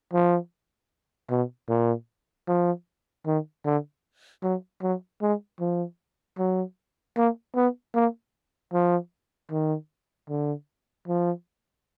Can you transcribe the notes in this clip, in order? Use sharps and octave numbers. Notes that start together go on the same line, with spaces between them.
F3
B2
A#2
F3
D#3
D3
F#3
F#3
G#3
F3
F#3
A#3
B3
A#3
F3
D#3
D3
F3